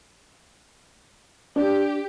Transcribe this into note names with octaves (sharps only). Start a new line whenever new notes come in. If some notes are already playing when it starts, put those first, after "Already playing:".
D4 G4